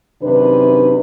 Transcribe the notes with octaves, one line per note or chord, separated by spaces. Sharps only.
F#2 C3 D#3 D4 B4